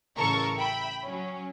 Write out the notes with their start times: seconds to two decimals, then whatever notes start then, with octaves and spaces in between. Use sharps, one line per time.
0.17 A1 C#3 A4 A#4 C#6 C#7
0.57 E5 G5 B5
1.03 F#3 C#4